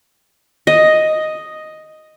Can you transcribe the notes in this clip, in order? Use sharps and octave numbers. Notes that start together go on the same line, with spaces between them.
D#5